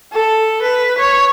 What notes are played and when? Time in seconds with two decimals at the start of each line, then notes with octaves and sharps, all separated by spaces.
0.12 A4
0.62 B4
0.98 C#5